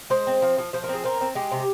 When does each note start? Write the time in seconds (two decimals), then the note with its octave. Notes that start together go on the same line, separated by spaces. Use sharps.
0.10 G#3 C5
0.27 C4
0.42 F3
0.58 F3
0.73 F3 C5
0.84 A#4
0.89 C4 G#4
1.04 C4 A#4
1.21 C4
1.35 G#3 G4
1.52 C3